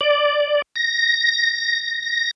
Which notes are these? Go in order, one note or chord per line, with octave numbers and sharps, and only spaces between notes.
D5
A#6